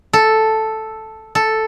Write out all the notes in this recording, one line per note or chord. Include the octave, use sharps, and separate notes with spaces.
A4
A4